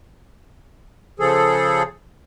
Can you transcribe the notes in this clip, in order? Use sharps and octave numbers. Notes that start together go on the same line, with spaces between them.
C#3 F3 G#4 A4